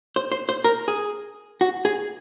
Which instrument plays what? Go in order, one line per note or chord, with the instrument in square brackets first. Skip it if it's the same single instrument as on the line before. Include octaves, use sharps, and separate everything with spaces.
[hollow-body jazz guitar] C5
C5
C5
A#4
G#4
F#4
G#4